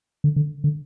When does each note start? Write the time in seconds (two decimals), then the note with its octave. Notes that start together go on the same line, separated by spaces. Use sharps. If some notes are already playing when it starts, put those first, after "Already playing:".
0.24 D3
0.36 D3
0.64 D3